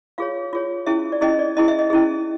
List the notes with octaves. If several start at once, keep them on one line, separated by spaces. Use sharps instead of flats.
F4 G#4 C#5 F5
F4 G#4 C#5
C#4 E4 G#4 E5
D5
C#4 E4 G#4 D#5
D5
C#4 E4 G#4 D#5
E5
D#5
C#4 E4 G#4